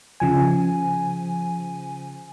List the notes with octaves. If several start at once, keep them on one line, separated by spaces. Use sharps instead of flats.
C#3 F3 G#5